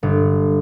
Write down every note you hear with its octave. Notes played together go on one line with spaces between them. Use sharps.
G1